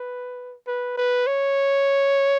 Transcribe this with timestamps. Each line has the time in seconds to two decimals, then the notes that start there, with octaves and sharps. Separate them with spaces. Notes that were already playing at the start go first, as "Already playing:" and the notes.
Already playing: B4
0.67 B4
0.97 B4
1.27 C#5